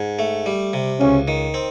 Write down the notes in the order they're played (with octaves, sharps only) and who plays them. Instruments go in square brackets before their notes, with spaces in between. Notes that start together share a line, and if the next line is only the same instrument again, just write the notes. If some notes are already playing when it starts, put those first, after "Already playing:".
Already playing: [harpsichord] G#2
A3
G3
C3
[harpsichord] C#2 [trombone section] C#4
[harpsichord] D#3
C4